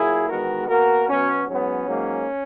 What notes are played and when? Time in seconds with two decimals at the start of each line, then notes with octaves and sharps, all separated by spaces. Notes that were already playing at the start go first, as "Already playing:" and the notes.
Already playing: A#2 F#3 A#3 E4 G#4
0.28 E2 D#3 G#3 B3 F#4 A#4
0.68 B2 A#3 F#4 A#4
1.07 B2 F#3 B3 C#4
1.47 G#2 F#3 B3 C#4
1.87 G#2 F#3 A#3